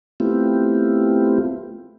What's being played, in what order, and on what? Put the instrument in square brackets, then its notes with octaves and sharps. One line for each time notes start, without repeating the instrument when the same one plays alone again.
[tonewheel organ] A3 B3 C4 E4 F4 G4